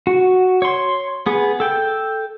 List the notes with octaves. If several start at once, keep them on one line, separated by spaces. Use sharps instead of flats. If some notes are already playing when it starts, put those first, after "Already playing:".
F#4
C#5 C6
B3 G#4
A4 G5